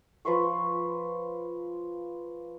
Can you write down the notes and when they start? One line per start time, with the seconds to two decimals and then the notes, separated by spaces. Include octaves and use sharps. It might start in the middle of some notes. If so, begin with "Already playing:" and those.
0.25 F3 B4 C6 C#6